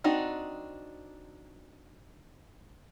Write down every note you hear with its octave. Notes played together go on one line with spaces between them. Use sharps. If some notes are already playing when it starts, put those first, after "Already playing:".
C4 D4 D#4 F#4